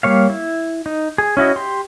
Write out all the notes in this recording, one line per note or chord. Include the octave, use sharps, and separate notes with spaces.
G3 A#3 C#5 F5
E4
D#4
G#4
C#4 E4 F#4 D#5
G4 C6